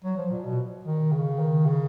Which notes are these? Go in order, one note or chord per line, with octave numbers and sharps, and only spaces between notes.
F#3
F3
A#2
B2
D#3
C#3
D#3
C#3